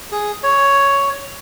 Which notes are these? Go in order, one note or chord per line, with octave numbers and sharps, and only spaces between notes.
G#4
C#5